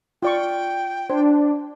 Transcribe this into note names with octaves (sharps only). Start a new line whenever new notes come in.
F4 D5 G5 C#6
D4 C5